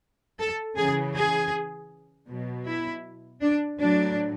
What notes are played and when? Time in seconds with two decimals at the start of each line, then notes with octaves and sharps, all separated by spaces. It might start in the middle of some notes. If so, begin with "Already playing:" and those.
0.39 A4
0.77 C#3 E3 G#4
1.15 G#4
2.29 B2 F#3
2.66 E4
3.41 D4
3.79 A2 F#3 D4